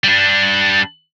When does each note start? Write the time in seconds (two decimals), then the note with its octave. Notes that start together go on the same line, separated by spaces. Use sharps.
0.04 G3 D4